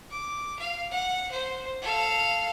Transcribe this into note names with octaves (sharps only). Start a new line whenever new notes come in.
D6
F5
F#5
C5
A4 F5